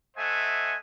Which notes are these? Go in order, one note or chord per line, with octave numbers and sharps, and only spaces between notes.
A3 C5 D#5 E5 F#5 G#5